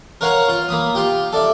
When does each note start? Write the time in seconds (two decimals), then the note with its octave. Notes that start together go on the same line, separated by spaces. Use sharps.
0.21 A#4 B4 C#5 F5 F#5 A#5
0.48 F4
0.69 A#3 B5 D#6
0.95 F4 G4
1.32 A4 D5 E5